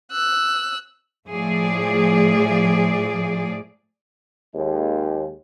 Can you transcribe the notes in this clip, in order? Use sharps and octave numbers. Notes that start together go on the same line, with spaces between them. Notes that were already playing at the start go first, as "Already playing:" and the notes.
E6 F#6
A2 F3 A3 G#4 D5
D#2 G#3